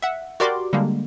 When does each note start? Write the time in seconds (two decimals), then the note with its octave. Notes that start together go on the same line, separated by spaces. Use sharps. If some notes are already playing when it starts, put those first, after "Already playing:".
0.02 E5 F#5
0.40 F#4 G4 A#4 D5 C6 D6
0.73 D3 G3 G#3 A#3